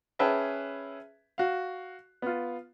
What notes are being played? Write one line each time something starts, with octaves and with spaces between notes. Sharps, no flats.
C#4 G#4 B4 E5 G5 A5
F#4 F5
B3 F4